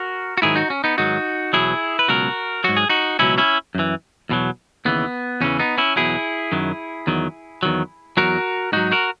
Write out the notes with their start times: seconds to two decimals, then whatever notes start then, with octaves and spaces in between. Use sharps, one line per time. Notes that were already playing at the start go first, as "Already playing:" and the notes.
Already playing: F#4 A#4
0.38 F#4
0.42 G#2 D#3 F#3 E4 G#4
0.56 D#4 F#4
0.70 C#4
0.84 B3 D#4
0.98 G#2 D#3 F#3 D#4 F#4
1.53 E2 B2 F#3 E4 G#4
1.99 B4
2.08 C#2 B2 F#3 F#4 A#4
2.64 G#2 F#3 F#4
2.77 G#4
2.89 D#4 F#4
3.19 C#2 B2 F#3 C#4 E4
3.38 C#4 E4
3.75 F#2 E3
4.29 E2 B2 F#3
4.85 D#2 C#3 E3 B3
5.41 E2 C#3 E3 C#4
5.59 B3 D#4
5.78 C#4 E4
5.96 E2 B2 F#3 E4 G#4
6.52 F#2 D#3 F#3
7.07 E2 D#3 F#3
7.63 E2 D#3 F#3
8.17 E2 B2 F#3 F#4 A#4
8.72 G#2 F#3 D#4 F#4
8.92 F#4 A#4